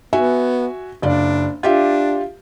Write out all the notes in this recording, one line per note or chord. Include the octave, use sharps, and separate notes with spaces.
B3 F#4 E5 G#5
F#1 D4 D5 F5
D4 F4 G4 E5